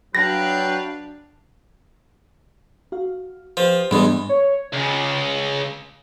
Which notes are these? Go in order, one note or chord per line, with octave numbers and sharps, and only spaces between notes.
F#3 D4 B4 F5 G5 A#6
F#4 F5
F3 G4 B4
E2 G#2 G3 G#3 D4
C#5
C#2 C#3